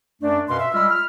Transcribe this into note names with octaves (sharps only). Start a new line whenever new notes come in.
F#2 A3 D4
F#2 B2 B4 F5 C6
E5
G3 G#3 F4 B5 E6 F6
F6